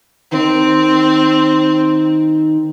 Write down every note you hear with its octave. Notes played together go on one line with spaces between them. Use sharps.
D#3 C4